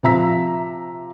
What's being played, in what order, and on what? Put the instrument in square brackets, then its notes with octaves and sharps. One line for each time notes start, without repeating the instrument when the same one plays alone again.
[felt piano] C3 F3 E5 A#5 E6 B6